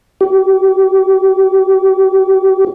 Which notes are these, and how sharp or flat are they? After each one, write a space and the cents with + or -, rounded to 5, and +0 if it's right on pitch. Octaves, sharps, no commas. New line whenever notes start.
G4 -35